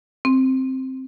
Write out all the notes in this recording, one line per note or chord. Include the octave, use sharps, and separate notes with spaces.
C4